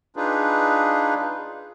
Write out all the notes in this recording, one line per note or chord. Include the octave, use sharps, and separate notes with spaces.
D4 D#4 F4 G#4 B4